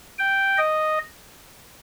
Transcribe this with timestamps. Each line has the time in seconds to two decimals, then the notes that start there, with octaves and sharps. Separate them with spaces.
0.19 G5
0.58 D#5